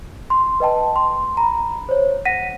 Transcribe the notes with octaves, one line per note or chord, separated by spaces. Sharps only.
C6
B4 D#5 G5 A5
C6
A#5 B5
C5 C#5
F#5 A#6 B6 D#7